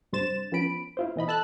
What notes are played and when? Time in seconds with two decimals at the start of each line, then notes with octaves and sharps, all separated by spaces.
0.12 G2 C3 D4 C5 A6 E7
0.52 F3 B3 C#4 B5 D7
0.97 E4 F4 C5
1.16 B2 E3 D#5 B5
1.28 A4 A5 E6 F#6